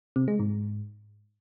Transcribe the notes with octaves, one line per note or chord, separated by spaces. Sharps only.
C3
G#3
G#2